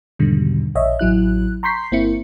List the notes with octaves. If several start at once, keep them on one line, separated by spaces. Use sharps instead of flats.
E2 G#2 B2 D3 D#3 G3
A#1 C#5 D#5 E5
A1 F#3 E4 F#6
A#5 C6 C#6 G6 B6 C7
G1 A#3 C4 E4 C#7